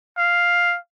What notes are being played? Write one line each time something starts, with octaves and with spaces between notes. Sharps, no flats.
F5